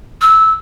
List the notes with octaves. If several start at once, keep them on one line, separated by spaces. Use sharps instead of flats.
E6